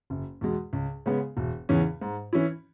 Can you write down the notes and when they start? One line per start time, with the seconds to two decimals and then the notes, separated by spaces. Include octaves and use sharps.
0.10 F#1
0.41 E2 B2 G#3
0.73 C#2
1.06 C#3 G#3 B3
1.37 E1
1.69 E2 C#3 E3 C#4
2.02 G#2
2.33 E3 C#4 E4